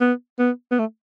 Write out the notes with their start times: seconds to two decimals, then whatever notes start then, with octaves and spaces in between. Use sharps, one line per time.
0.01 B3
0.39 B3
0.71 B3
0.79 A3